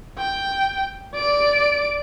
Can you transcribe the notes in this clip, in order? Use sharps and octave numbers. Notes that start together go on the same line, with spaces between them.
G5
D5 D7